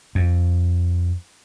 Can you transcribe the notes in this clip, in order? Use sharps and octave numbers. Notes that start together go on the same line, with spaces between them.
F2